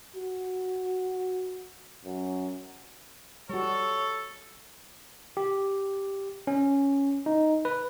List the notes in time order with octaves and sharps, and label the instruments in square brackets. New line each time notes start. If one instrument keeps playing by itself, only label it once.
[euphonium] F#4
F#2
[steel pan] G3 F#4 [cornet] A4 [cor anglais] C#5
[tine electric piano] G4
C#4
D#4
B4